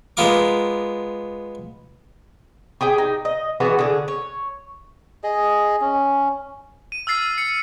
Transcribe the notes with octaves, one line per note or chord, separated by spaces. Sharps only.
G#3 B3 F4 A#4 D6
G4 G#4 G5
D#4
D#5
E3 B3 F#4 G#4
D3 G#4
C#5
G#4 D#5
C#4
D#7
E6 F6 A6 C7
C#7